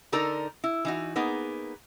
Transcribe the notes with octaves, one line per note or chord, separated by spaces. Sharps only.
D3 D#4 A4 A#4 D5 A#5
E4
E3 D#4 F#4
A#3 B3 D#4 G#4